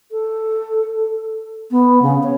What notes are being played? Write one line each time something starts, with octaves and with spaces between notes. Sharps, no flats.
A4
B3
C#3
C#5